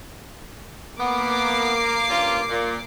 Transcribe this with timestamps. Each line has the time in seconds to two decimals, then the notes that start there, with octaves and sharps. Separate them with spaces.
1.00 A#3 B3 D6 C7
2.08 G2 C#4 F4
2.50 A#2